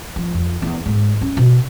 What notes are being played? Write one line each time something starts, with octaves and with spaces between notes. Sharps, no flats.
F3
F2
E2
G#2
C#4
B2